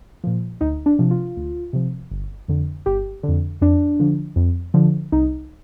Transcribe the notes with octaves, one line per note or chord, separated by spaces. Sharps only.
A#2 F3
D2 D#4
D4
C3 F3
F4
D2
C3 F3
G1
F2 D3
G1 G4
D3
F2
F2 D4
D3 F3
F2
D3 F3
C2 D#4